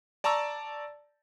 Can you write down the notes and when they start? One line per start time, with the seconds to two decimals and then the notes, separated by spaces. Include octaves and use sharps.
0.24 D5 A5 A#5 C#6 E6